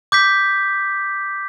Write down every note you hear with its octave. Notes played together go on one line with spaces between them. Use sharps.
D6 G6 B6